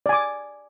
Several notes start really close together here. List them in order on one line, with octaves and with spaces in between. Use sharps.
D5 G#5 D6